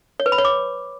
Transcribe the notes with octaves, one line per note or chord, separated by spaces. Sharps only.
C#5
B4
B5
C#5
D6